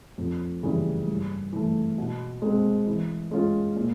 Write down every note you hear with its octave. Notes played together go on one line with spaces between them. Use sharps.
F2
C#3 E3 G3
G2
E3 A3
B2
G#3 C4
E3
G#3 C#4 F4
A#2